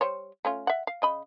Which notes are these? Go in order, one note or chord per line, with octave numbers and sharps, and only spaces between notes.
G3 C5 C#5
A3 C#4 F4
E5 F#5
F5
C#3 D#5 B5